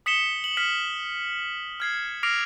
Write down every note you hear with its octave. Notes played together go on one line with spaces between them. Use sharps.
D#6 B6 C#7 E7 G7
F#7
F6 B6 C#7
F6 G#6 C7
D6 F6 A#6 C7 D7 F7